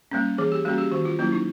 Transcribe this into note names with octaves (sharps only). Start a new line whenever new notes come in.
G3 A#3 C#4
E3 G#4
G4
G3 A#3 C#4 F#4
G4
D#3 F#4
F4
F#3 A#3 C#4 E4
D#4